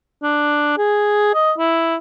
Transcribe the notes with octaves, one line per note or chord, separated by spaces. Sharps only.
D4
G#4
D#5
E4